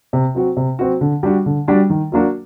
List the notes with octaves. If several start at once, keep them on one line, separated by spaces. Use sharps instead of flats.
C3
F#3 C4 F#4
C3
F#3 C4 F#4
D3
G3 D4 F#4
D3
G3 D4 F#4
D#3
F#3 A#3 D4 F#4